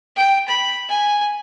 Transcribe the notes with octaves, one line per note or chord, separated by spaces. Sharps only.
G5
B5
G#5